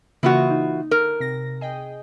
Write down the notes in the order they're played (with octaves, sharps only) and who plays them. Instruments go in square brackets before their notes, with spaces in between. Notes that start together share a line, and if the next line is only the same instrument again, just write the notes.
[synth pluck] C#3 A#3 D#6 [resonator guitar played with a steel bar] E3 F4 F#4
[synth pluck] D#4
[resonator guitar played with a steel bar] A#4
[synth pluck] C3 A#6
G#4 D#5 G5